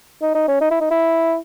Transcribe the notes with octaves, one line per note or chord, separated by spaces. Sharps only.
D#4
D#4
C#4
D#4
E4
D#4
E4